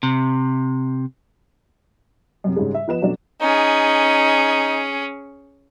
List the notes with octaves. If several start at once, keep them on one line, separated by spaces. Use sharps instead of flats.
C3
F#2 C3 C4
G#2 C#3 G3 G#3
E5
F3 B3 B4 D#5 E7
B2 F#3 A3 C#4 D4
C#4 D#4 G#4